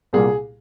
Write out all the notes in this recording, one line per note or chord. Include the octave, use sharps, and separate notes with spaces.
C2 A#2 G3 A#3 G#4